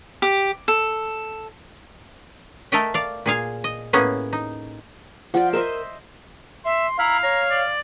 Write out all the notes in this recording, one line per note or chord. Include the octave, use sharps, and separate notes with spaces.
G4
A4
A3 A4 A#4 D#5 E5 G5
D5 F5
A#2 G#4 F5 G#5
D#5
A2 A#3 B3 C#4 G#4
D#4
F3 F4 D5 F#5
A#4 C5 D#5 E5
E5 C6
E4 F5 A#5
C#5 A#5
D5